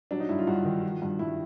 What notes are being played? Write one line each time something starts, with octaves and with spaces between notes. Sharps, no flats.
F#3 D4
D#4
G2 E4
F4
G2 F#4
D#3
F3
G2
G2 E4